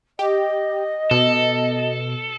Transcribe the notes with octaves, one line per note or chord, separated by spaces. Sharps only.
G4 D#5
B2 A4